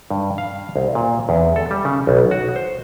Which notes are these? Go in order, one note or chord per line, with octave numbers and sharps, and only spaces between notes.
G2
F5
C2
A#2
E2
A4
G3
C#3
B1
F#4
C5